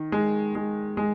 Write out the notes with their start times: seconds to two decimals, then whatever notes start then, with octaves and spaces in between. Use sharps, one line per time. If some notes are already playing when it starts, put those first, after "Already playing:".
Already playing: D#3
0.12 G#3
0.55 G#3
0.97 G#3